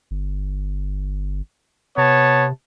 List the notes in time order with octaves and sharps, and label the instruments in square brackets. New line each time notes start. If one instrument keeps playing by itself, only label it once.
[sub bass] G1
[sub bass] C3 [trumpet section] B3 C#5 A5